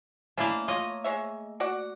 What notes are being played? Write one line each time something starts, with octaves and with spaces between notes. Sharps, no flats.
A3 A#3 C#4 D4 E4
F4 C#5 D#5
G#3 C#5 E5
F#4 D5 F#5